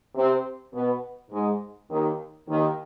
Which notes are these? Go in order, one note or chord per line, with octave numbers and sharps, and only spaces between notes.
C3 C4
B2 B3
G#2 G#3
D#2 D#3
D#2 D#3